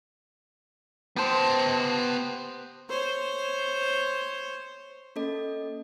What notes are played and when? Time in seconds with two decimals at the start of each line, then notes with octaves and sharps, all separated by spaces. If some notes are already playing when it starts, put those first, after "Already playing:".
1.16 B3 G4 C5 A5
2.89 C5 C#5
5.16 A#3 C#4 A4 D#5